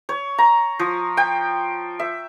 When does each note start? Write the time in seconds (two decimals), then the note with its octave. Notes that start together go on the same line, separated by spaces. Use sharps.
0.09 C#5
0.38 A#5
0.79 F3
1.17 G5
2.00 E5